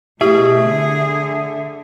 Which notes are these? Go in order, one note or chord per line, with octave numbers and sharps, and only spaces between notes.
B2 A3 E4 G4 G#4 E5
D3